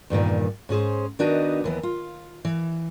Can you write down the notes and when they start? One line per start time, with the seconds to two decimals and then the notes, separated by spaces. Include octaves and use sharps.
0.10 E2 G2 A#2 D#3
0.69 G#2 C#4 G#4 C5
1.19 D#3 B3 D4 D#4 F#4 D#5
1.64 D#2 E3 B3
1.83 F4
2.45 E3